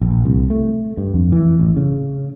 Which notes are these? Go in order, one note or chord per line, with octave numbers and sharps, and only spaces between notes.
A#1
C2
A3
G2
F2
E3
A1
C#3